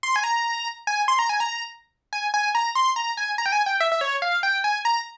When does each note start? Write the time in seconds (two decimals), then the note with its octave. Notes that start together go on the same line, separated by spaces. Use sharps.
0.03 C6
0.16 G#5
0.24 A#5
0.87 G#5
1.08 C6
1.19 A#5
1.29 G#5
1.40 A#5
2.13 G#5
2.34 G#5
2.55 A#5
2.75 C6
2.96 A#5
3.17 G#5
3.38 A#5
3.46 G5
3.52 G#5
3.66 G5
3.80 E5
3.92 E5
4.01 C#5
4.22 F5
4.43 G5
4.64 G#5
4.85 A#5